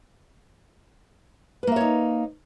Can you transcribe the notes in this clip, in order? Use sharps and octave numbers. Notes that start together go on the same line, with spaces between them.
A#3 D#4 B4 C#5 E5